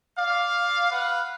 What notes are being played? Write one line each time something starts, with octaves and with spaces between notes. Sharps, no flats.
D5 F5
B4 F5 F#5